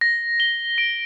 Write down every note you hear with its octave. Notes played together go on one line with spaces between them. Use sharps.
A#6
G7
D7